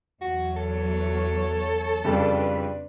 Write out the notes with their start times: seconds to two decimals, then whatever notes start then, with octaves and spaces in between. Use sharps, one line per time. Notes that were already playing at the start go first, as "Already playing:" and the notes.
0.21 E2 F#3 F#4
0.57 A4 C#5
2.04 F2 C#3 G3 D4 B4